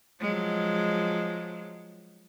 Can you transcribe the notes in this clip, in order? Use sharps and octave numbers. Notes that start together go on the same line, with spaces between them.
F3 F#3 G#3